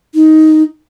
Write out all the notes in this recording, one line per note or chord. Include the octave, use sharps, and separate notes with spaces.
D#4